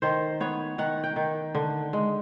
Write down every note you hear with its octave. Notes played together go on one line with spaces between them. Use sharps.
D#3 C5
B3 C#5
D#3 F#5
G5
D#3
D3
G#3